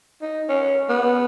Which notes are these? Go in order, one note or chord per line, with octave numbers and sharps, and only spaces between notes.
D#4
C#4
B3